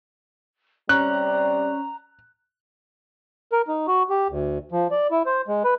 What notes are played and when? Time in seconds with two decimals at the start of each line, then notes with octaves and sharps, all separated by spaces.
0.89 C3 G3 C#4 D5 A#5 F#6
3.52 A#4
3.68 D#4
3.88 F#4
4.10 G4
4.29 D2
4.72 F3
4.91 D5
5.11 E4
5.26 C5
5.48 G#3
5.64 B4